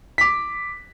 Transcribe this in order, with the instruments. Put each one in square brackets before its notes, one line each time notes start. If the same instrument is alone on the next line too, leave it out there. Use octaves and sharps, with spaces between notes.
[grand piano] D6 B6